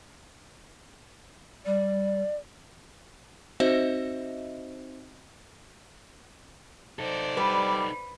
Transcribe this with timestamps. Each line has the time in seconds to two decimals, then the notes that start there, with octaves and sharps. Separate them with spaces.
1.66 G3 D5
3.60 C4 D#4 F#4 C5 D#5 E5
6.99 D#4 A4 C5 D5
7.37 G3 B4